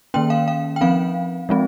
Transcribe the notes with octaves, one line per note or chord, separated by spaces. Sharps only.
D#3 A#3 C#4 G5
F5
F5
G5
F3 C4 F5
F3 G#3 C4